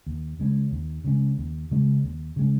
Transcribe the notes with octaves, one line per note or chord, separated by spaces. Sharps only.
D#2
C#3 G#3 C#4
D#2
C#3 G#3 C#4
D#2
C#3 G#3 C#4
D#2
C#3 G#3 C#4